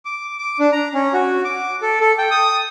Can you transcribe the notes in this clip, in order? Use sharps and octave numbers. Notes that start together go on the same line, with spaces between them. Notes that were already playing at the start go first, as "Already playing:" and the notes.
D6
D6
D4
A#5
C#4
F#4
D6
A4
A4
G5
D#6